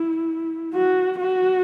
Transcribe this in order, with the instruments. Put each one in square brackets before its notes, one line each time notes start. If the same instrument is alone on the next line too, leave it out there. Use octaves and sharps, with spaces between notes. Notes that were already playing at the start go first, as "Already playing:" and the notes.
Already playing: [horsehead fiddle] E4
F#4
F#4